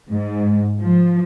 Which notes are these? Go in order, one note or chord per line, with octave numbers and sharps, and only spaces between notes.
G#2
F3